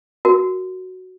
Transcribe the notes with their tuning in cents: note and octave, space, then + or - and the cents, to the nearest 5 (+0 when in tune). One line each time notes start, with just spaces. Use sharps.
F#4 +0 A#4 +0